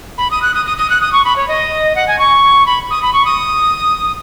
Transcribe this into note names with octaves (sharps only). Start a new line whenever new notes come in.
B5
D#6
F#6
D#6
D#6
D#6
F#6
D#6
C#6
B5
C#5
D#5
F#5
G#5
C#6
B5
D#6
B5
C#6
D#6